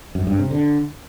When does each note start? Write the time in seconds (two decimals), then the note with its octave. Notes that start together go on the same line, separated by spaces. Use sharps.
0.15 F#2
0.27 G2
0.39 C3
0.51 D3